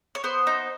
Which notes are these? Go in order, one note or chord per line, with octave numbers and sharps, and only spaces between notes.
C#5
B3 C5
D#4